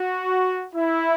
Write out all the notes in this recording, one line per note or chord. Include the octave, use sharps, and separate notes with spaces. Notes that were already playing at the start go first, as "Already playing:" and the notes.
Already playing: F#4
E4